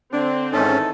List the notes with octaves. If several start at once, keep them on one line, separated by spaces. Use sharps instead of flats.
D3 C4 D4
G#2 D#3 E3 C#4 D#4 A4